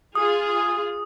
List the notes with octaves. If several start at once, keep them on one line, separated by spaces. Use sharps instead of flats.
F4 G#4 D#6